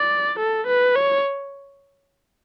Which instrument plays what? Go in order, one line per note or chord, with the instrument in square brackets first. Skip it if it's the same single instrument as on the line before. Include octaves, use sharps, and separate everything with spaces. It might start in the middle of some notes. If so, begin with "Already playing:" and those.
Already playing: [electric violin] D5
A4
B4
C#5